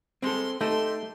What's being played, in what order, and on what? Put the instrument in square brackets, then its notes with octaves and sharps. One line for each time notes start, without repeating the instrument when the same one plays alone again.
[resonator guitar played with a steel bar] G3 G#3 [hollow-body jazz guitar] C4 A4 [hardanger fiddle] C6
[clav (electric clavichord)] A3 [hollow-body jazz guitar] D#4 [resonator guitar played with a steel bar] G4 A4 [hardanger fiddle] C6